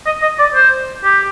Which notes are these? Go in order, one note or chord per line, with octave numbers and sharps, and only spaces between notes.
D#5
D#5
D5
C5
G4